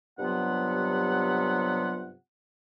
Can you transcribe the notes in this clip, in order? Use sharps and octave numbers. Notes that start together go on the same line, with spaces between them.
G2 C3 F#3 B3 F4 F#5